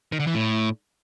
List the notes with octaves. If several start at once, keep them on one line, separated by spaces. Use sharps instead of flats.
D#3
D3
E3
A2